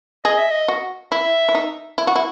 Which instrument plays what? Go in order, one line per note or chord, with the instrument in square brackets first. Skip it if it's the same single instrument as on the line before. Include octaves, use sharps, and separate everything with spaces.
[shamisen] G#4 [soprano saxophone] D#5
[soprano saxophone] E5
D#5
[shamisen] F#4
[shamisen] E4 [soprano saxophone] E5
[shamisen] E4
D#4
E4
F#4
E4